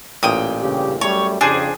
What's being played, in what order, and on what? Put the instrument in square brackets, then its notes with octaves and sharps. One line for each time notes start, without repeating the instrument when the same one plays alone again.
[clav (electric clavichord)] A1 A#2 [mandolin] G5 D#6
[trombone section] G2 C#3 G4
[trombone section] F#2 G3 A3 [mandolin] C#5
[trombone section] F2 C#3 G4 [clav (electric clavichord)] D4 C5 [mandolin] G#4